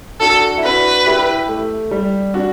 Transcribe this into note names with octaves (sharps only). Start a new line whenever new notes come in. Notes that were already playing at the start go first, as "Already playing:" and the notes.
D4 F#4 A4
E4
D4 F#4 B4
E4 G4
A3
G3
D4 F#4